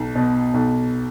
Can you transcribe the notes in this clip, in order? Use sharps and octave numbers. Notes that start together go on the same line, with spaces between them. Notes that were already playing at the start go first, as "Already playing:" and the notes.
Already playing: B1
B2
B1